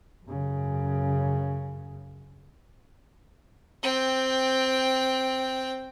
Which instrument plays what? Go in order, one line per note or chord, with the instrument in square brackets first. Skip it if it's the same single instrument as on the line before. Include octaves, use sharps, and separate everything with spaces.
[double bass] F#2 C#3
[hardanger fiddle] C4 G5